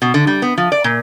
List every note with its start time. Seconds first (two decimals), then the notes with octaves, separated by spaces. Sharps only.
0.02 B2
0.14 D3
0.27 G3
0.42 B3
0.58 F3
0.72 D5
0.84 A#2